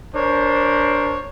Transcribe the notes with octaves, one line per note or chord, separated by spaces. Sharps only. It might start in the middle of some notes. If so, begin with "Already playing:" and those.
D4 A#4 C5 C#5